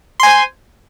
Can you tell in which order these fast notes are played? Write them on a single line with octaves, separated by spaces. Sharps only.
C6 G#5 C5